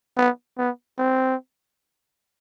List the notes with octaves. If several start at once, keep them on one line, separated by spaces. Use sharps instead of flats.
B3
B3
C4